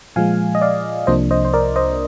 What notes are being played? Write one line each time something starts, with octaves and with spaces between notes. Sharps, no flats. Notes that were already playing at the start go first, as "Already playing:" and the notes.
A#2 F3 G#3 F5 G#5
D#5
D5 F5
C2 C3 F3 A#3 D4 C5 D#5
C5 D#5
C5
A#4 D5
C5 D#5